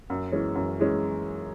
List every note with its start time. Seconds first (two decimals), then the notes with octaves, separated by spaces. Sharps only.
0.10 F#2
0.32 E3 G#3 C#4
0.55 F#2
0.79 E3 G#3 C#4